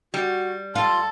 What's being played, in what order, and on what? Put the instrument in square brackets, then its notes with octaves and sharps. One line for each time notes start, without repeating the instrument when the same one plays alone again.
[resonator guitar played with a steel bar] G3 [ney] F#4
[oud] F4 [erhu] A4 [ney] C6